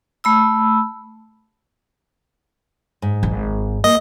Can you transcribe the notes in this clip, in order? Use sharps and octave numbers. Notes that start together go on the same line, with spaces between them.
A3 B5 E6
G#2
G#1
A#3 D#5